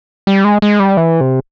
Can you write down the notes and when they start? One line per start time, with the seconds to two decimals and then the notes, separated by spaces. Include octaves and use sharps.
0.27 G3
0.44 G#3
0.62 G#3
0.80 G3
0.97 E3
1.21 C3